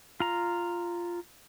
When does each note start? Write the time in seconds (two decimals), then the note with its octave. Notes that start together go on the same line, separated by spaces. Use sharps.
0.20 F4 A#5